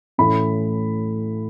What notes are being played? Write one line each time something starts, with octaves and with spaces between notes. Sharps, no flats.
A2 E3 A3 C#4 E4 B5